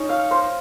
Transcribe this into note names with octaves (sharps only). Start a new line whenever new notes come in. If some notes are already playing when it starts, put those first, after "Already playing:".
Already playing: C#4 D#4
F5
C5